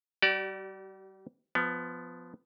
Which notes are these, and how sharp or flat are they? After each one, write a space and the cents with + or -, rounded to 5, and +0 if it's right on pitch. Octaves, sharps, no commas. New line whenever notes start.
G3 -25 G4 -45 D5 +0
F3 +0 B3 +15